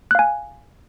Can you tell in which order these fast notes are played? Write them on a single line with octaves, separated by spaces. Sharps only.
F#6 F5 G#5